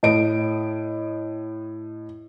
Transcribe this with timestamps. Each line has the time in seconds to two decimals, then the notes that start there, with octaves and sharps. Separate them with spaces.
0.03 A2 D#5 D7